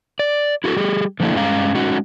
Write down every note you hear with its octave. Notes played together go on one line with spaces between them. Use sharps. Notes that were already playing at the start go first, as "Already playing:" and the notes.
D5
E4 F#4 G4 A4
G3 G4 G#4
D3 F3 A3 A#3 D4 E4
G2 G#3 C#4 F5 A#5
G#3 C#4 D#4 F#4